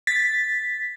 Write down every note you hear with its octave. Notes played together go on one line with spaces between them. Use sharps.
A6 B6